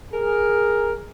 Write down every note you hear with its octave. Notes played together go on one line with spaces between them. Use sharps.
G#4 A#4